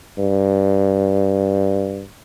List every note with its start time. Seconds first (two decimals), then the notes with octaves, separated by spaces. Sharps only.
0.18 G2